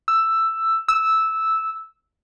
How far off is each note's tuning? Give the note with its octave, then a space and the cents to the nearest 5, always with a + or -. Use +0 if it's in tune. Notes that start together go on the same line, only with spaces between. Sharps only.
E6 +5
E6 -10